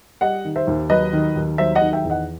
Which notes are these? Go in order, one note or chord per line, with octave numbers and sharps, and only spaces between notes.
G3 D#5 F#5
D#3
C5 E5
D#2
F#3 B4 D#5
D#3
D#2
F#3 C5 E5
D#5 F#5
D#3
E5 G5
E2
D#5 F#5